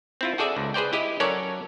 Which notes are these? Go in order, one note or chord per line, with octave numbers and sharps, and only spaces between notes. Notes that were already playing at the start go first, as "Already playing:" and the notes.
C4 E4 F4
F#4 G#4 A4 D5 E5
C#2
G#4 B4 C5 D5 G5
E4 G4 D#5
F#3 C#4 A4 A#4 C#5 D5